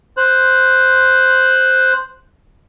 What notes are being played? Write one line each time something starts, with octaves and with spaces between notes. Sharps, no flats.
C5 F#6